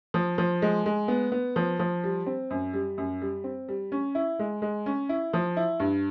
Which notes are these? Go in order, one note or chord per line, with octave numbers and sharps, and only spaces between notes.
F3
F3
G#3
G#3
B3
B3
F3
F3
G3
C4
F#2
G3
F#2
G3
C4
G3
C#4
E4
G#3
G#3
C#4
E4
F3
E4
G2